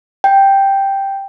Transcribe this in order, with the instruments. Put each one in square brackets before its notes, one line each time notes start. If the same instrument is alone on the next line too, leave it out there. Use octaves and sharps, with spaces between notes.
[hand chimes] G5